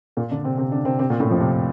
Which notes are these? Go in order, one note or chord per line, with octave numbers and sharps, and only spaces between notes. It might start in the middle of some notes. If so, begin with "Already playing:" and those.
A#2 A#3
D3 D4
C3 C4
C3 C4
D3 D4
C3 C4
C3 C4
A#2 A#3
A2 A3
F2 F3
C3